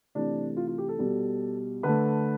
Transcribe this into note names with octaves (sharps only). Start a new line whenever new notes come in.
C3 E3 A3 D4
F4
F4
G4
A4
B2 G3
D3 A3 B4